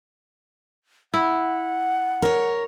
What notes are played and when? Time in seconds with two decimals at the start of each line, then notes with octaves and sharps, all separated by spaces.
1.14 E4 F#5
2.22 A#4 C#5